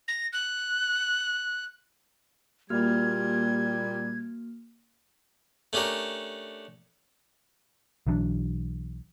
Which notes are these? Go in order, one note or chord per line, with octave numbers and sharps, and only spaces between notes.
A#6
F#6
A#2 G3 A#3 F#4 F6 G#6
A3 C#4 D4 G4 A#4
B1 E3 F#3 D4